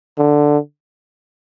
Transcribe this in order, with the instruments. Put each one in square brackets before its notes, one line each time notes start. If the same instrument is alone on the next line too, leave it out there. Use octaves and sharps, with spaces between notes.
[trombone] D3